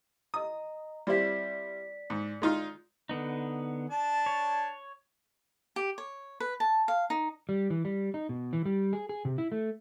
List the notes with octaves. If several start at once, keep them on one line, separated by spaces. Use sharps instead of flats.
D#5 A#5 D#6
G3 C4 E4 D5 B6
G#2
G#3 D#4 F4
D3 B3 D#4
D4 A5
C#5
G4
C#5
B4
A5
F5
D#4
G3
E3
G3
D#4
B2
E3
G3
G#4
G#4
C3
E4
A3